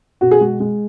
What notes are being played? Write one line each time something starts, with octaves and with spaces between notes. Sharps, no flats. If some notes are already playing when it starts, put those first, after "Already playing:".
B2 F#4
G#4
G#3 F#4
G#3